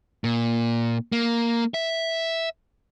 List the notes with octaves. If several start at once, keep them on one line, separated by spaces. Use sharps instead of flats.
A#2
A#3
E5